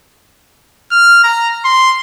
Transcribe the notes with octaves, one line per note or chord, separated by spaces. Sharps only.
F6
A#5
C6